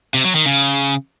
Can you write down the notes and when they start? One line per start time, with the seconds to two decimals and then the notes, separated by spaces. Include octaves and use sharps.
0.14 C3
0.25 F#3
0.35 D#3
0.46 C#3